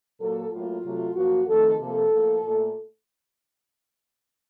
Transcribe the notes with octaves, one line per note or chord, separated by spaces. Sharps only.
A#2 F#3 A#3 A4
A2 F#3 A#3 F4
C3 F#3 A3
F#2 F3 A#3 F#4
F2 D#3 A3 A4
C3 F3 A#3 A4
A2 F3 A#3
A#2 A3